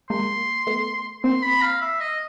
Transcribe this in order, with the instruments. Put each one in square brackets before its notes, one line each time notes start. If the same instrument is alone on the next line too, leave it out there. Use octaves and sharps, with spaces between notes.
[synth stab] G#3 A#3 [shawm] C6
[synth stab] A3 B3
[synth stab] A#3 C4 [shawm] C6
[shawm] B5
F5
E5
D#5